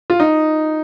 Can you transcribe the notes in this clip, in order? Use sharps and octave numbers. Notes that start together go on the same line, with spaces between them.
F4
D#4